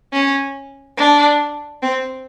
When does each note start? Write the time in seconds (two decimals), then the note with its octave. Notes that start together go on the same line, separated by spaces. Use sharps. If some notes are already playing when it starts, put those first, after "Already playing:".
0.13 C#4
0.97 D4
1.82 C4